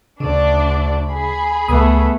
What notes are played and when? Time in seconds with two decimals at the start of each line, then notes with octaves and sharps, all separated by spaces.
0.20 D2 C#3 D4 D5
1.08 G#4 B5
1.68 C#2 A3 B3 D#6